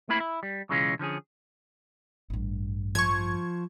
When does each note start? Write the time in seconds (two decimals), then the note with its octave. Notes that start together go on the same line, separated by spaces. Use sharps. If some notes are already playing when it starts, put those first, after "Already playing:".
0.09 A3 A#3 C4 E4 B5
0.20 E4
0.43 G3
0.69 B1 C#3 E3 G#3 C#4 F4
0.99 D3 F3 C#4 G#4
2.30 A1 G2
2.95 F3 C#6 G#6